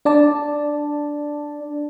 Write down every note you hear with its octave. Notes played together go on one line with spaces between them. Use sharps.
D4 D5 A5